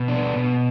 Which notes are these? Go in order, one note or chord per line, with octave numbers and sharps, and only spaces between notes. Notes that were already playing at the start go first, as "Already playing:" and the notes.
Already playing: B2
D4
B3
B2